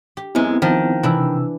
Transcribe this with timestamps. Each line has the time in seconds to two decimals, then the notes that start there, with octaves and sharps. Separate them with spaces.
0.17 G4
0.35 F#2 G#3 B3 C4 E4
0.62 D#3 F3
1.03 C3 E3 D4 E4 E6